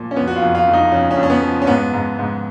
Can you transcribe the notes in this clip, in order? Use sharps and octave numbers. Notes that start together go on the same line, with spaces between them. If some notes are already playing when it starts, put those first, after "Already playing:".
Already playing: A#2 F3
C#4
F2 B3
F#4
F4
F2
F4
F2
D#4
F2 C#4
C#4
F2
C#4
B3
F3
C#4
G#2 B3
G#2
G#2